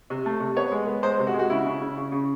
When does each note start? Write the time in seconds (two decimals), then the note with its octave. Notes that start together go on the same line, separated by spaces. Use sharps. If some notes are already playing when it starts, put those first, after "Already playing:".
0.10 C3
0.26 A3
0.40 C3
0.56 B3 C#5
0.72 G#3
0.87 B3
1.03 G#3 C5
1.19 C3
1.27 F#4
1.34 G#3
1.39 F#4
1.50 C#3 E4
1.66 C#3
1.82 C#3
1.98 C#3
2.12 C#3